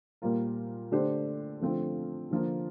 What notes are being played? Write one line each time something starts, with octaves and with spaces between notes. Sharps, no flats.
A#2 G3 A#3 F4 A#4
D3 A3 D4 G4 C5
D3 F3 A3 C4 F4
D3 F3 A#3 F4